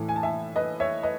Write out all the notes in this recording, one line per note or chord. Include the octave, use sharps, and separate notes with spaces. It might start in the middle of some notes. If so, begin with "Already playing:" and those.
Already playing: A2 E3 A3
G#5
A5
E5 G#5
B4 D#5
C#5 E5
B4 D#5